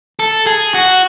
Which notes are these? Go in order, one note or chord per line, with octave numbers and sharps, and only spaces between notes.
A4
G#4
F#4